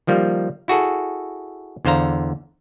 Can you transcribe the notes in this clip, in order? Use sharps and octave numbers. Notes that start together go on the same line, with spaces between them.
D#3 F3 G3 A#3
E4 F#4 G#4 A4
E2 D3 C5 F5 A#5